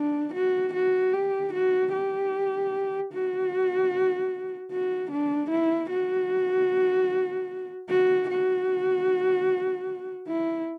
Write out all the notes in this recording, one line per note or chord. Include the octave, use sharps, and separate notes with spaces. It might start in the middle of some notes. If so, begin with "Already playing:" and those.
Already playing: D4
F#4
F#4
G4
F#4
G4
F#4
F#4
D4
E4
F#4
F#4
F#4
E4